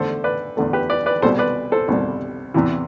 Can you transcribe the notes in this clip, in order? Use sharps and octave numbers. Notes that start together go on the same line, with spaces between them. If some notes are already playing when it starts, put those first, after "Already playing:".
Already playing: E2 D3 A3 A4 C5
B4 D5
E2 D3 A3
G4 B4
B4 D5
B4 D5
C2 B2 G3 A4 C5
B4 D5
A4 C5
C2 B2 G3
E2 C3 E3